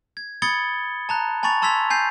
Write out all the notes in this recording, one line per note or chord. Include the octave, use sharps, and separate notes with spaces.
G#6
B5 D#6 G#6 A6 C#7 G7
A5 A#5 F#6
G#5 A5 B5 C#6 A6 F7
A5 C6 E6 G#6 B6 F7
G#5 G6 C7